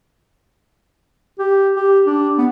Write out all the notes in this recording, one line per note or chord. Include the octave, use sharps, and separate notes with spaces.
G4
G4
D4
B3